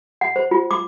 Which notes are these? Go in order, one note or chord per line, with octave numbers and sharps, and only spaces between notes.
F#5
C5
F4
D6